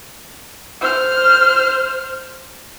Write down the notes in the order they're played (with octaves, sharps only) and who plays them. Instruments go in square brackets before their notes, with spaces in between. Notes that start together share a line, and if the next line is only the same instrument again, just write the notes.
[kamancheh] C5 F6